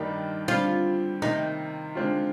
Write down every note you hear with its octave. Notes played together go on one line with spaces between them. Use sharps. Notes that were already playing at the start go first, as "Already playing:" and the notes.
Already playing: G2 D#3 G3 A#3 D4 D#4
D3 G3 C4 F4
C3 D#3 A#3 D#4
D3 G#3 C4 F4